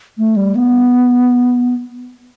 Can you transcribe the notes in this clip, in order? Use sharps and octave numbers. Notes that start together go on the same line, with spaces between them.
A3
G3
B3